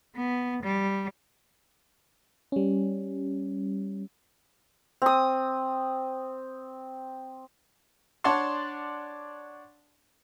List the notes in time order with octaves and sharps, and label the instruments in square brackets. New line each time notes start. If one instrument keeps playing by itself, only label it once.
[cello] B3
G3
[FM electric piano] G3 C#4
[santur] C4 D#6
[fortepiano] D4 C#5 D5 F#5 A5 C6